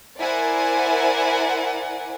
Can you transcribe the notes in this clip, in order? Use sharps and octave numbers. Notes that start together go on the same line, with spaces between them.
E4 A#4 C5 D5 F#5 G#5